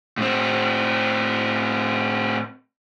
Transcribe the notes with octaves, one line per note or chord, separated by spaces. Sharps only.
A2 C4